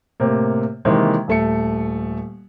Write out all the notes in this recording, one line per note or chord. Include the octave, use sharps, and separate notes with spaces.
A2 C3 A#3
C3 D#3 E3 G#3 A#3
D#1 A3 C#7